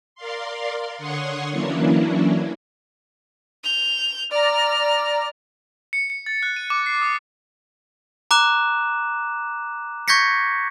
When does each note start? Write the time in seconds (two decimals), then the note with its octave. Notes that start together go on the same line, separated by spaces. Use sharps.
0.15 A#4 D5 F5 C6
0.98 D3 C#5 F#5 C6 C#6 D#6
1.52 E3 F#3 A#3 C#4 D4 E4
3.64 G6 F7
4.31 D5 A#5 F6
5.93 C#7
6.10 C#7
6.26 A6
6.43 F#6
6.56 D#7
6.70 D6
6.86 C7
7.02 D#6
8.31 A#5 D6 F#6 E7
10.08 C#6 G6 G#6 A#6 B6 C#7